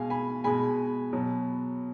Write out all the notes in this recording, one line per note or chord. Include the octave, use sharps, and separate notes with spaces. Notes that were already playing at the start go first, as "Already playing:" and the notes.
Already playing: B2 G#3 F5 G#5
G#5 B5
B2 G#3 G#5 B5
B2 F#3